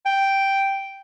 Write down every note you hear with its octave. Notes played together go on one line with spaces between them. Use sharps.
G5